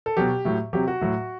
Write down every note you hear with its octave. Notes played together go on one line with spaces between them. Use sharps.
A4
B2 F#3 G4
A2 F#3
C3 F#3 G4
F#4
A2 F#3